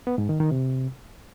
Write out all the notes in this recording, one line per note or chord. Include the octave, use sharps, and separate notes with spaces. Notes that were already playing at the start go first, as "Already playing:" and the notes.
B3
G#2
D#3
D#3
C3